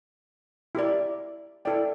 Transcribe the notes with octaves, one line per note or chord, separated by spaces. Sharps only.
E4 G4 A#4 D5
E4 A4 D5 G5